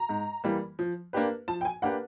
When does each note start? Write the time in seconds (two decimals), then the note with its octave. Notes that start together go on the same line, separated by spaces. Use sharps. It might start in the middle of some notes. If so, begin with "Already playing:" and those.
Already playing: A#5
0.09 G#2
0.44 E3 G3 A#3
0.79 F3
1.13 A#3 D4 G4 B4
1.48 F3 A5
1.61 G5
1.65 G#5
1.82 A#3 D4 G4 B4 F#5